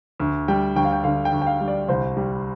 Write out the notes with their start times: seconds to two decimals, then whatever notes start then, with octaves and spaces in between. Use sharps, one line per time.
0.20 D2
0.48 G3 G5
0.76 D2 G5
0.85 F5
0.93 G5
1.04 D3 F5
1.25 G5
1.32 D2
1.42 G5
1.47 F5
1.61 G3
1.68 D5
1.88 C2 C5
2.17 G3